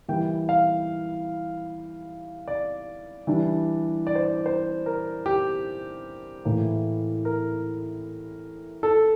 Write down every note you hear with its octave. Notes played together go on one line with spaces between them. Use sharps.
E3 G3 A#3 G5
F5
D5
E3 G3 D4
D5
C5
D5
C5
A#4
G4
A2 E3 A#3
A#4
A4